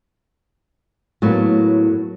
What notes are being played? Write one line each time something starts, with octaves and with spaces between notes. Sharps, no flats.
A2 F#3 A#3 B3